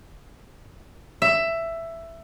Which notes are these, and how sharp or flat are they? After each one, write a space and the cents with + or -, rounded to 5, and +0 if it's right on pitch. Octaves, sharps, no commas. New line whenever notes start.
E5 +10